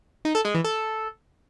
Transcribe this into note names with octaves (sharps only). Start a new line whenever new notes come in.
D#4
A4
G#3
E3
A4